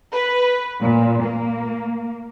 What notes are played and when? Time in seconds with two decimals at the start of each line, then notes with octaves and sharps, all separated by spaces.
0.13 B4
0.82 A#2
1.24 A#3